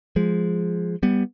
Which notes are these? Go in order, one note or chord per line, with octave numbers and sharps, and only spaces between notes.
F3 G#3
G3 B3